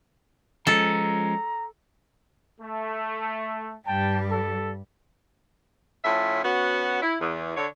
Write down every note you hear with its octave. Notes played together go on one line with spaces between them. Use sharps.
F3 G#3 C#4 A4 A#5
A3
G2 G3 G5 A5
A4
A2 F3 C#4 E5
B3 C#4 F#4
E4
E2
D3 C#5